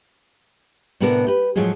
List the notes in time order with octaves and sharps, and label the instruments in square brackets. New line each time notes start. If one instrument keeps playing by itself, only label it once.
[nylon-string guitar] A2 C3 B3 D4 A4 A#4
G4 B4
A2 F3 F#3 G#3 F4 G#4